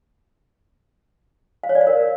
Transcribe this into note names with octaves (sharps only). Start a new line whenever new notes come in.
F5
C#5
D5
F5
A#4